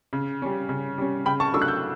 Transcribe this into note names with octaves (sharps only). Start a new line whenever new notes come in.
C#3
G3 C#4
C#3
G3 C#4
C#3 G5 B5
A5 C#6
F#3 A3 D4 C#6 E6
F#6
E6 G6